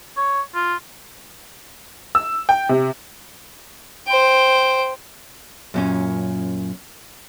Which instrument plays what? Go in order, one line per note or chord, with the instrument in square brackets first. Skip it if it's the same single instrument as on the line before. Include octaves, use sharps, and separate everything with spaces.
[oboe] C#5
F4
[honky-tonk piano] E6
G5
C3
[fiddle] C5 G5
[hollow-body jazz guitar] F#2 A#2 C#4